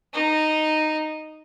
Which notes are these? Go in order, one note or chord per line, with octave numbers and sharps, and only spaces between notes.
D#4